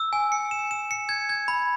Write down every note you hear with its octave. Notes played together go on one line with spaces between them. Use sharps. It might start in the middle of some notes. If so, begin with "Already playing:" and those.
Already playing: E6
G#5
C#7
E7
E7
C#7
G#6
G#6
B5